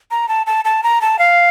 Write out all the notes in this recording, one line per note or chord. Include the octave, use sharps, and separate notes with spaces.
A#5
A5
A5
A5
A#5
A5
F5